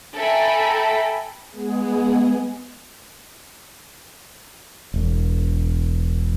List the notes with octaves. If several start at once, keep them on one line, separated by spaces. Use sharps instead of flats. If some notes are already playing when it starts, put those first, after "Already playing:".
A4 E5 G5 G#5 A#5 B5
G#3 B3 G#4
E1